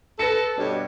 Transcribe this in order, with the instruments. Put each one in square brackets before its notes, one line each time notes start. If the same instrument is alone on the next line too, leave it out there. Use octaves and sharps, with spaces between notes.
[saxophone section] A4 [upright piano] B4 A#6 C#7
[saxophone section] G2 B2 C#5 [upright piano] D4